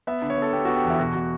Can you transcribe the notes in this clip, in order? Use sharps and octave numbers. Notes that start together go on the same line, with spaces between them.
B3 E5
D3
C#5
B3 A4
B3 G4
B3 F#4
G4
E2
E4
B2 F#4
B2